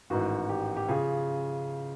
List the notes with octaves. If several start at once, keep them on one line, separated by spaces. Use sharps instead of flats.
A1 G#2 D#3 F#4
G4
G4
C#3 F3 G#4